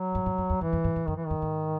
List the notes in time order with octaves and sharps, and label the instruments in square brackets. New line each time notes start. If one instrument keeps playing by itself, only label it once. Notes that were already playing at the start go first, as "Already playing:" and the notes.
Already playing: [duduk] F#3
[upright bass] G#2
G#2
F#2
E2
[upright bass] F#2 [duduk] E3
[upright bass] F#2
G#2
G#2
[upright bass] F#2 [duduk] D#3
[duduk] E3
[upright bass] F#2 [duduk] D#3
[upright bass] G#2